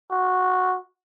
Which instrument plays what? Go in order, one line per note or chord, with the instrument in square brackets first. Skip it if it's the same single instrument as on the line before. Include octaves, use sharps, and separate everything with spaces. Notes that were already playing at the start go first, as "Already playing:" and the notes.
[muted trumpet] F#4